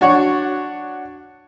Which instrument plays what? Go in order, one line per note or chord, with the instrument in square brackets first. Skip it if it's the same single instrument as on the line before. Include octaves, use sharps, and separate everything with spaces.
[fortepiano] D4 F#4 C#5